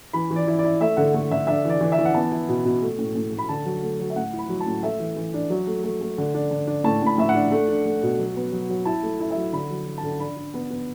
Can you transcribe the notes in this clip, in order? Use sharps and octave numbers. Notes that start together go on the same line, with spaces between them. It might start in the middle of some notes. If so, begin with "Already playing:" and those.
E3 B5
E3
D5
E4
D5
E4
A3 E5
D3 F#5
A3
D3 E5
D4 E5
E3 D5
E3
E5
E3
F#5
B3 A5
E4
B2
B2
A3
A2
A2
A3
B5
D3 A5
F#3
A3
F#3
E5
A2 F#5
E4
B5
F#3
A5
A2
A3 E5
E3
E3
D4
F#3
A3
A3
A3
D3
D4
D3
D4
A2 A5
A2 B5
A2 E5
F#5
D4
A3
D4
A3
B2
F#3
B3
F#3
F#3
E4 A5
A3
E4
E5
F#3
D3 B5
F#3
F#3
A5
D3
D4 B5
D4
B3
B3